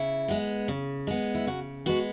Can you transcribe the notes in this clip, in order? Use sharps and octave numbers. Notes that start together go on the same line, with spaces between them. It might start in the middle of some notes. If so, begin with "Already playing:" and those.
Already playing: C#3 E4
G#3 B3
C#3
G#3 B3
E4
C#3 F#4
G#3 B3 F#4